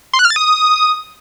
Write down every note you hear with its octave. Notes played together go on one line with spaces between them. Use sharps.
C6
F#6
F6
A6
D#6